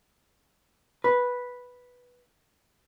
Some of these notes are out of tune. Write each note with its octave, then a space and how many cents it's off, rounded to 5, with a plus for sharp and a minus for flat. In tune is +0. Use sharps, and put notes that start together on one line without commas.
B4 -5